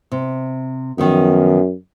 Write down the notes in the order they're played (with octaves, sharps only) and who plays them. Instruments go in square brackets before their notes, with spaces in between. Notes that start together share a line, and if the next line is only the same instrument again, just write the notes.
[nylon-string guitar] C3
[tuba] F#2 [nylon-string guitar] D#3 F3 B3